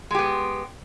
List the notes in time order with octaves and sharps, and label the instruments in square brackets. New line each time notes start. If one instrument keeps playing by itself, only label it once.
[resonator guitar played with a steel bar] G#3
G4
B3